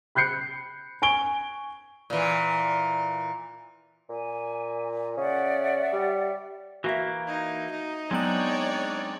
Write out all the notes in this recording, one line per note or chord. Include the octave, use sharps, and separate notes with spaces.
B5 F#6 G6 C7 C#7
G#5 C#6 D7 G7
A#2 E3
A#2 G#5
C#3 D5 E5 F#5
G3
E3 A#3 F#4 E5
D#4
D#4
F#3 G#3 B3 C4 D4 C#5 D5 F#7